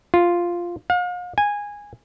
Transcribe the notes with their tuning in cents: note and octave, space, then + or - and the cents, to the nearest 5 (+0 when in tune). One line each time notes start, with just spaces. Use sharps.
F4 -5
F5 +40
G#5 -15